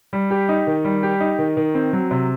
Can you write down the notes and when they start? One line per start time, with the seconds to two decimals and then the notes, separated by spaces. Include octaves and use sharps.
0.13 G3
0.31 G4
0.49 D#4
0.67 D#3
0.85 G3
1.03 G4
1.20 D#4
1.39 D#3
1.57 D#3
1.75 C4
1.93 F#3
2.11 C3